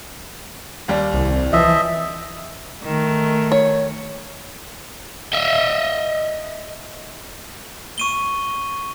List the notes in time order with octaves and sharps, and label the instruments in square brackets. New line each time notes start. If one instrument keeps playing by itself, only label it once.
[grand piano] D#2 G3
[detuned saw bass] C2
[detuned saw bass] E3 [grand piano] F3 [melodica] D#5 E5
[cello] D#3 A3
[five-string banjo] C#5
[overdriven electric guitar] D#5 E5
[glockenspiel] C#6 D#7 G7